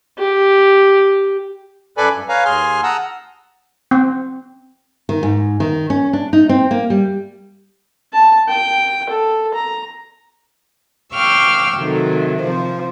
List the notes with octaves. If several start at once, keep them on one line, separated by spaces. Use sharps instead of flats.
G4
F#2 A4 B4 D5 G#5 B5
G2
B4 C#5 F5 G#5 A#5
D#2 G#4 G#5 C6 F6
F#5 A5 A#5 D#6 E6
C4
D#3
G#2
D#3
C#4
D4
D#4
C4
A#3
G3
A5
G5
A4
A#5
F5 G5 C#6 D6 E6 F6
C3 D#3 F#3 A3
C3 F3 C5